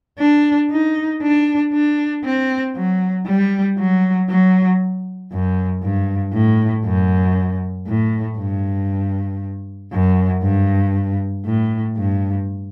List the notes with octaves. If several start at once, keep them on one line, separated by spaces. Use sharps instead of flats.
D4
D#4
D4
D4
C4
F#3
G3
F#3
F#3
F#2
G2
A2
F#2
A2
G2
F#2
G2
A2
G2